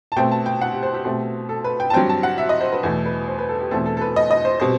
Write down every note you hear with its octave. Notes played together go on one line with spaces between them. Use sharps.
A5
B2 A3 C4 G5
A5
G5
F#5
G4
C5
G4
B2 A3 C4 G4
A4
B4
G5
A5
G2 F#3 C4 G5
A5
F#5
E5
D#5
C5
B4
E2 B2 A3
B4
C5
B4
A4
G4
E2 B2 A3 C4 A4
A4
A4
B4
D#5
D#5
C5
B2 G3 C4 C5